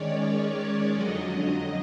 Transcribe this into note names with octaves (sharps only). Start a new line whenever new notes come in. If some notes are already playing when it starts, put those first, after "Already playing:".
Already playing: D#3 G#3 C#4 C#5 D5
C#5
D5
F2 D3 F#3 D#5